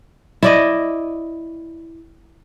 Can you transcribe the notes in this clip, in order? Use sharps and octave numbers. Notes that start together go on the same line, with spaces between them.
E4 D5 D#5